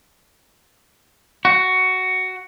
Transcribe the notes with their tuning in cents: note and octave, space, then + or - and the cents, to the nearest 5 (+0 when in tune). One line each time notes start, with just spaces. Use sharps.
F#4 +10